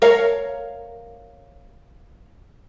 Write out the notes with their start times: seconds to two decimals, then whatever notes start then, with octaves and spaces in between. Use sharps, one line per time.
0.02 A#4 C#5 F5